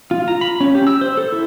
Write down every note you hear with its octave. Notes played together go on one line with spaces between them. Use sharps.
F4
A#5
B5
C#4
G4
E6
C5
A4
E4